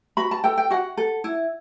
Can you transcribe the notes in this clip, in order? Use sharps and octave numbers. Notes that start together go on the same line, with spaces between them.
F#4 B5
A5
A4 G5
G5
F#4 F#5
A4
E4